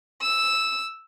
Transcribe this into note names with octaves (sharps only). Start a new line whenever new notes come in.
E6